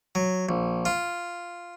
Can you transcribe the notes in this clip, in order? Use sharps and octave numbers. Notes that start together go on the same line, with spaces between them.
F#3
A#1
F4